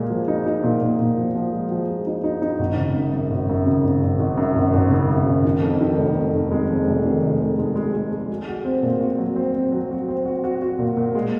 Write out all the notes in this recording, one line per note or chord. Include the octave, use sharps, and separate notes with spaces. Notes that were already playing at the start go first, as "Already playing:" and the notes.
Already playing: A#2 G#3
F3
D#4
D#4
A#2
A#2
A#2
F3
F3
G#3
F3
G#3
D#4
D#4
D#4
G#1
C#3
F#2
F#2
G#1
F#2
C#3
G#1
G#1
G#1
F#2
G#1
G#1
C#3
F#2
G#1
D#3
F2
D#3
F1
F2
F2
G#3
F2
F1
D#3
F1
G#3
G#3
G#3
G#3
G#3
F#4
F#4
C4
A#2
F#4
F#3
C4
C4
F#3
F#4
C4
F#4
F#4
F#4
A#2
A#2
G#3